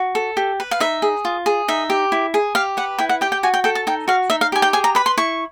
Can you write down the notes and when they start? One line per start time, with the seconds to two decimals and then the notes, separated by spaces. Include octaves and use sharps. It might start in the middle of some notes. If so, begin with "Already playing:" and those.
Already playing: F#4
0.15 A4
0.37 G4
0.60 B4
0.71 F5
0.80 D#4 E5
1.02 G#4
1.25 F4
1.46 G#4
1.68 D#4 E5
1.90 G4
2.12 E4
2.34 G#4
2.55 G4 F5
2.77 B4 F#5
2.99 E4 G5
3.09 F#5
3.21 G4 G5
3.32 G5
3.43 F#4 G#5
3.54 G5
3.64 A4 G5
3.75 A5
3.87 D#4 G5
4.08 F#4 F5
4.30 D#4 E5
4.41 F5
4.52 G4 G#5
4.62 G5
4.73 G#4 G#5
4.84 A#5
4.95 B4 B5
5.06 C6
5.18 E4 C#6